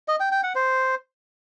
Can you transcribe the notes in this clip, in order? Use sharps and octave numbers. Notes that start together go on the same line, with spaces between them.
D#5
G5
G5
F#5
C5